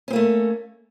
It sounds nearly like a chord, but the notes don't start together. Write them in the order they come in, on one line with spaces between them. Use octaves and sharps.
C#4 C4 A#3 A3